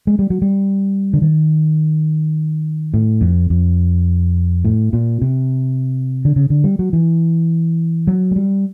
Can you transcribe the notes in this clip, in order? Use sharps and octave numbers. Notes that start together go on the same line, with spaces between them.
G#3
G3
F#3
G3
D3
D#3
A2
F2
F2
A2
A#2
C3
D3
C#3
D3
G3
F#3
E3
F#3
G#3
G3